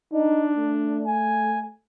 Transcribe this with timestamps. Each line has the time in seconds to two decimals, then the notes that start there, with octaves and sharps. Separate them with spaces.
0.13 D4 D#4
0.57 A3
1.07 G#5